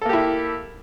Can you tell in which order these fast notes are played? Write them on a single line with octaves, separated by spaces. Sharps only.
A4 A#3 G4 E4